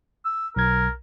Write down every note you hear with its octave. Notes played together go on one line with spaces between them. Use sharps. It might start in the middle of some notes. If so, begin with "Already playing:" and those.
E6
B1 A#4 G#6